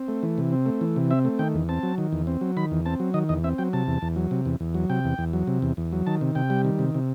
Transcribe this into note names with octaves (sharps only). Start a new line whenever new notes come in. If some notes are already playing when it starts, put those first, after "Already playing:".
Already playing: C4
A3
E3
C3
C4
A3
E3
C3
C4 E5
A3
D#3 G5
E2
C4 A5
F#3
D#3
E2
C4
F#3
D#3 B5
E2
C4 A5
F#3
D#3 D#5
E2 D#5
C4 E5
F#3 G5
C3 A5
E2
E2
F#3
C3
E2
E2
F#3
C3 G5
E2
E2
F#3
C3
E2
E2
F#3
D#3 A5
C3
C3 G5
G3
D#3
C3
C3